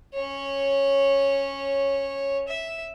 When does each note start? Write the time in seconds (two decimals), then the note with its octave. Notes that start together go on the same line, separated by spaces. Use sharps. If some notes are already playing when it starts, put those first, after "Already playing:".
0.14 C#4 C#5
2.48 E5